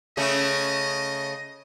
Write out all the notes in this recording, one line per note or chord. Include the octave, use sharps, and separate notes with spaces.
C#3 A3 C#4 D#5